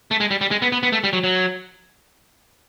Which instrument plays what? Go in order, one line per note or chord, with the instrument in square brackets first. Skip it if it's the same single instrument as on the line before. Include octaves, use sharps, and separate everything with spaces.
[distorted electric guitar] A3
G#3
G3
G3
G#3
B3
B3
B3
A3
G3
F#3
F#3